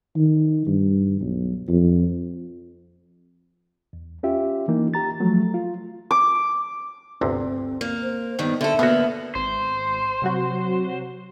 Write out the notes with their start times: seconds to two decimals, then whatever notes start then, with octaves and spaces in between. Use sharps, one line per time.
0.16 D#3
0.67 G2
1.21 B1
1.69 F2
3.93 E2
4.23 C#4 F4 G4 E5
4.68 E3 A#3 D#4
4.94 G4 A#5 A6
5.20 F3 F#3 A3
5.54 F4
6.11 D6
7.21 G1 D2 C3 C4
7.81 A#3
8.03 C5
8.39 G2 D#3 B3
8.61 D3 A4 E5
8.79 B2 D3 A#3 B3 F#4
9.35 G#1 C5
10.22 C3 F#3 F#4